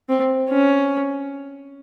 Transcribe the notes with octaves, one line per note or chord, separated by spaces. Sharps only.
C4
C#4